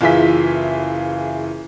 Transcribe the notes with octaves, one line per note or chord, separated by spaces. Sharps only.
F#1 E3 F4 G#4 E5 B6